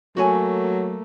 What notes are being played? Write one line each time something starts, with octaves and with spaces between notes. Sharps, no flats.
F#3 A3 A#3 F#4 C#5 G#5